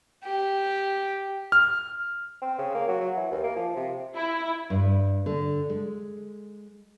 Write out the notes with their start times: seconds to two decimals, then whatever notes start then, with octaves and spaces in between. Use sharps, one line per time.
0.24 G4
1.52 F6
2.41 C4
2.58 C#3
2.75 A#3
2.88 F#3
3.00 F#3
3.16 E3
3.31 D#2
3.44 A#3
3.56 F3
3.76 C3
4.15 E4
4.70 G2
5.26 D3
5.70 G#3